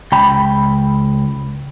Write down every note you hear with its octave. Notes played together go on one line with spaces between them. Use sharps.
C#2 G5 B5